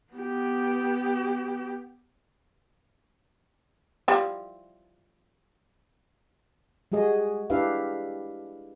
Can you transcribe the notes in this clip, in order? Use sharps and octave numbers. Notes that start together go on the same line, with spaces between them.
B3 G4
F3 G3 E4
G3 G#3 F#4 G#4 D#5
D4 E4 G4 B4 E5 F5